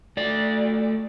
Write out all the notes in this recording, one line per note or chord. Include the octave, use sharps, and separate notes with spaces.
A3 D5